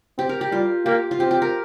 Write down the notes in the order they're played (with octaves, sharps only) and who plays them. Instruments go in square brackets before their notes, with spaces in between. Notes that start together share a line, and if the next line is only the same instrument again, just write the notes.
[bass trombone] C4 [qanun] G4
[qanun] A#4
G4
[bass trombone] G3 [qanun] F4
[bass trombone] A#3 [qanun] G4
[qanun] F4
[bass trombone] C4 [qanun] G4
[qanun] G4
A#4